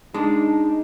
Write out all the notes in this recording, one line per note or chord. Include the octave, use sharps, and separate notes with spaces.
G#3 D4 D#4